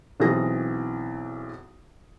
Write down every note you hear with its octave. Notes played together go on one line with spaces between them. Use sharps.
B1 E3 C4 G#4 A#6